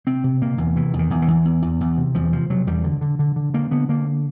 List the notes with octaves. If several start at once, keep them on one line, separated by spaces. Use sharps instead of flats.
C3 C4
C3
C3 A#3
E2
C3 E3
E2
D#3
E2
E3
E2
E2
E2
E2
C3
E2 F3
C3 F3
C3 F#3
E2 G3
D3
D3
D3
D3
D3 A#3
D3 B3
D3 A#3